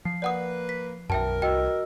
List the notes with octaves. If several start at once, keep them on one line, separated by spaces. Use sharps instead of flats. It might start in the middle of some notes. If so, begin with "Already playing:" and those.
F3 C7
A#3 B4 D5 F#5 D#6
B6
B1 F#2 E3 A#4 E5 G5 A5
C2 F#4 D#5 G5 E6